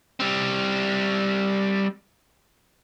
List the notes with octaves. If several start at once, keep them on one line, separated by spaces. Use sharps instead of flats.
G3 C4